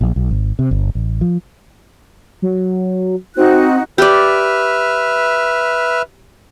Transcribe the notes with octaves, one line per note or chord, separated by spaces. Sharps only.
A#1
B1
G#1
C3
G1
A1
F3
F#3
C4 D#4 F#4 F#6
G4 B4 D5 E5 F6